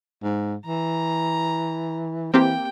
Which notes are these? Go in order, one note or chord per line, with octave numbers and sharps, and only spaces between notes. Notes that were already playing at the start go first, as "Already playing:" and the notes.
G#2
E3 A#5
E3 A#3 C4 G4 G5